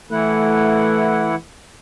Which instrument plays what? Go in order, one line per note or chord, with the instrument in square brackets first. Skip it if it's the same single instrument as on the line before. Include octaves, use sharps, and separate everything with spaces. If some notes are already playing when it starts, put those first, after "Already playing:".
[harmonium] E3 E4 F#5 [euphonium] A3